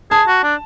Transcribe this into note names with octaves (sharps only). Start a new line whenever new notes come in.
G#4 A5
F#4
D4